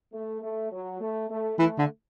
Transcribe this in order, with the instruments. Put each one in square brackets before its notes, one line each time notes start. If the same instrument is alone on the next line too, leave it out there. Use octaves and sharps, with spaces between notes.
[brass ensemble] A3
A3
F#3
A3
A3
[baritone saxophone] E3 [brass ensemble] A3
[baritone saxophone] D3